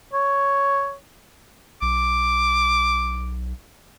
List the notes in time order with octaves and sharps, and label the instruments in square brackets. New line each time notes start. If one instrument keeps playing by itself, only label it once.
[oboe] C#5
[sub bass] B1 [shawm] D6